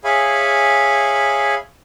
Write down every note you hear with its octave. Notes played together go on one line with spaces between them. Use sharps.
G#4 C#5 E5 F5 G#5 B5